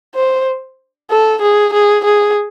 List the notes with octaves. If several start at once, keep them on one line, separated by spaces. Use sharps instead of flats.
C5
A4
G#4
G#4
G#4